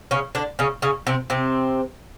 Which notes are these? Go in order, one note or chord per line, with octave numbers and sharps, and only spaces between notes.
C#3 C#4
D3 D4
C#3 C#4
C#3 C#4
C3 C4
C3 C4